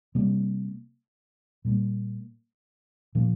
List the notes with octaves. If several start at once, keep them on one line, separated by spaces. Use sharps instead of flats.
C3 G3 A#3
A#2 G3 A#3
A#2 F3 A#3